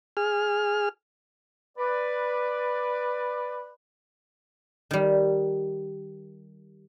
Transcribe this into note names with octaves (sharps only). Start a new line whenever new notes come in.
G#4 F6
B4 D5
D#3 G3